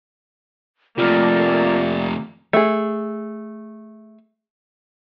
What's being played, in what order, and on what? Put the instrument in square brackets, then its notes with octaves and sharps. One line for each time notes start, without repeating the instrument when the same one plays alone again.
[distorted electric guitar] F2 C3 [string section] A3 A#3 [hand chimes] F4 F6 [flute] D5
[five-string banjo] A3 G#4